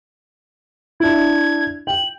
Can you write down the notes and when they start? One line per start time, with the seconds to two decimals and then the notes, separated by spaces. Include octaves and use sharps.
1.00 D4 E4 G#6
1.87 G5 F#7